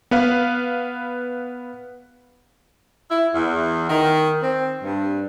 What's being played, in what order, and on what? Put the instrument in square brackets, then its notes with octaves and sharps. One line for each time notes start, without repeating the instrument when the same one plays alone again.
[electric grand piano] B3 B4 F5
[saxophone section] E4
E2
D#3
C4
G2